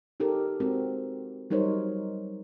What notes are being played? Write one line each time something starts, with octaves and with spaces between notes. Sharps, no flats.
D#4 G4 A4 A#4
G#3 C4 F#4 A#4
F#3 G3 D#4 A#4 C5 C#5